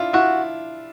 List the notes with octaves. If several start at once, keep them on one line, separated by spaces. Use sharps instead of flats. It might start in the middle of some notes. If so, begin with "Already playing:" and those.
Already playing: D4 E4 F4
E4 F#4